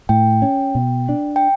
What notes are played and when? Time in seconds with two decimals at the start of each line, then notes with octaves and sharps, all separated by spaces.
0.09 A2 G5
0.42 C#4
0.75 B2
1.09 D4
1.36 G5